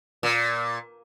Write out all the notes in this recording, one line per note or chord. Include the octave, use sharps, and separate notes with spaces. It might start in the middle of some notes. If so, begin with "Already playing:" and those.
A#2